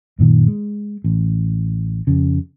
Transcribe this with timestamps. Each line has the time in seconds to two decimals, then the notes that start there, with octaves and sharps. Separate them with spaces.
0.19 F#2 A#2 D#3
0.48 G#3
1.04 A1
2.07 F2 C#3